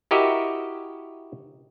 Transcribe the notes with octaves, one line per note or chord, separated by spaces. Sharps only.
E4 F#4 G4 A#4 D#5 E5